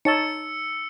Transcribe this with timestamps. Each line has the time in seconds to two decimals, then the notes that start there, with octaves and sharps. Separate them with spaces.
0.05 D#4 C#5 A5 E6 C#7